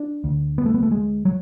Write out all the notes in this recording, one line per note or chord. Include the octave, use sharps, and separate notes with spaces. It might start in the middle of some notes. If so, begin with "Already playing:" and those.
Already playing: D4
D2 D3
B3
A3
B3
A3
G#3
F#3